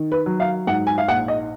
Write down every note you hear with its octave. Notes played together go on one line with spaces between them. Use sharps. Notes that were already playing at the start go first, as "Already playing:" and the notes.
Already playing: D#3
B4
F#3
F5
G#2 F#5
G#5
F5
A#1 F#5
D#5